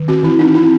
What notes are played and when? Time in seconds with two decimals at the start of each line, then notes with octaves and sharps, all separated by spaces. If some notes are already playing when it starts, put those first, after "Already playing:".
Already playing: D#3
0.08 C4 F#4
0.23 E3 E4
0.39 C4 D#4
0.55 C4 E4